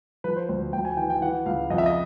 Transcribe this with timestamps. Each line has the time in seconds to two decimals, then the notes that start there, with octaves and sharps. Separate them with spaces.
0.24 F3 B4
0.36 C5
0.49 D2 C5
0.73 D2 G5
0.85 G#5
0.97 E3 G5
1.10 G5
1.21 E3 F#5
1.46 C#2 F5
1.70 F2 D#5
1.78 E5
1.86 D#5